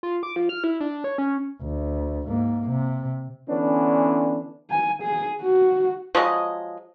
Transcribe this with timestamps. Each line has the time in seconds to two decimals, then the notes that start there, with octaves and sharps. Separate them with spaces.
0.03 F4
0.23 D6
0.36 F3
0.49 F6
0.64 E4
0.80 D4
1.04 C#5
1.18 C#4
1.62 D2
2.28 G#2 A#3
2.69 C3
3.49 D3 E3 B3 C#4 D4
4.70 G#5
5.02 G#4
5.42 F#4
6.15 F3 F#3 G#3 D#5